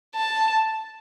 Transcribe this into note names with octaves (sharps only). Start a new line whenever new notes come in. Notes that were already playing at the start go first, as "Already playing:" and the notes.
A5